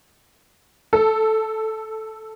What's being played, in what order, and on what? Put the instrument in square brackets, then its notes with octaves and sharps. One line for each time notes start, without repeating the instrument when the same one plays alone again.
[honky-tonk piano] A4